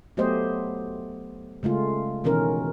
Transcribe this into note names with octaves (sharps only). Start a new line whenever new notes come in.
F#3 A3 B3 G4 C5 D#5
C#3 G#3 A3 F4
B2 D#3 E3 C#4 A#4